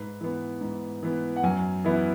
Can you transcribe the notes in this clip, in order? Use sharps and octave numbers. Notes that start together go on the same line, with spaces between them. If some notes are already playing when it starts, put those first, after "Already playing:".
Already playing: G#2 B4
E3 B3
G#2
E3 B3
F#5
F#2 G#5
E3 B3 E4